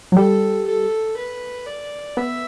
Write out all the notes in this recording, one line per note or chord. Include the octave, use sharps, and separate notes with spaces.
F#3
G3 A4
A4
B4
D5
B3 E5